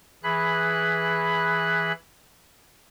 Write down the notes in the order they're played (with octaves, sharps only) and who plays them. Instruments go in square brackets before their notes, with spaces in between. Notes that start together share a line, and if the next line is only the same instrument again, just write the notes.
[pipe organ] E3 G#4 B5 F#6